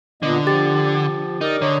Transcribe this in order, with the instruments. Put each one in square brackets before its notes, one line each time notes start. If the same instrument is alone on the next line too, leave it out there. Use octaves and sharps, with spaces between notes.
[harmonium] A#2 B3 D#5 [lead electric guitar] D3
[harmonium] F3 [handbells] G4 A6
[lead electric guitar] D#4 [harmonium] A#4 D5
[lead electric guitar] D3 [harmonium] C#5 D#5 A#5